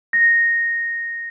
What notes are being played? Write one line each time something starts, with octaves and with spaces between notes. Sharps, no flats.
A#6